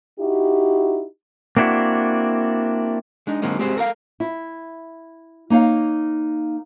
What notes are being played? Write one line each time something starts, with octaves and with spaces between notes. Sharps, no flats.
D#4 E4 F#4 G4
A#3 C4 D4 E4 F#4
G#3 D4 D#4
D3 F#3 G#3 A#3 C4 D#4
G3 G#3 C4 F#4 G4 C5
A4 A#4 D5 F5
E4
A#3 D#4 C#5 F5